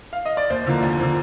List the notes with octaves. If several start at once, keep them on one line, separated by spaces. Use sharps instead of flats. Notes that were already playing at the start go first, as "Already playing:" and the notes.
F5
D#5
D5
D#2 C5
D3 F3 A#3
D#2
D3 F3 A#3